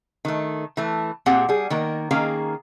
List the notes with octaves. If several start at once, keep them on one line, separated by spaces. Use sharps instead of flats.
D#3 A3
E3 A3
A#2 C4 G4 G#4 F#5
G3 G#4
D#3 A#3 A#4
D#3 A#3 C#4 G#4 F5 A#5